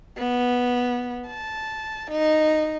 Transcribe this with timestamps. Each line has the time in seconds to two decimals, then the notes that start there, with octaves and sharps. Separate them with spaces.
0.18 B3
1.28 A5
2.11 D#4